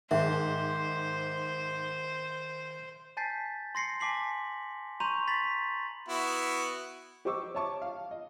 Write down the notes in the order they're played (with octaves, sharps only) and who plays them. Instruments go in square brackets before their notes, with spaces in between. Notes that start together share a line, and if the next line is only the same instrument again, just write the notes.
[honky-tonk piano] G#2 [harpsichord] D#3 [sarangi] C5 [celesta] E5
[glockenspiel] G#5 A5 G6 A6 B6 C7
C6 A#6 C7 C#7
G#5 A5 D6 B6 C7 F#7
A#5 C6 C#6 G6 D#7 F7
B5 A6 B6 F#7
[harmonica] B3 E4 F#4
[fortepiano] G4 C5 D#5 C#6 D6 E6
C#5 E5 A5 C#6 D6
F5
D#5